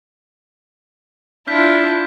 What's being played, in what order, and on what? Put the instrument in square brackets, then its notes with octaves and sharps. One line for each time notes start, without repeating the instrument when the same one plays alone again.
[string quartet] D4 E4 F4 [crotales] F6 G6 B6